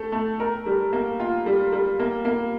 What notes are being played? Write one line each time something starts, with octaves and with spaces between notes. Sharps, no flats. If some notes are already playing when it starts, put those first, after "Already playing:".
Already playing: A3 A4
A3
A#4
G3
A#3
F4
G3
G3
A#3
A#3